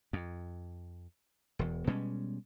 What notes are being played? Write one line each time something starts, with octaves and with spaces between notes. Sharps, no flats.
F2
E1 E2
B2 G3 G#3 C#4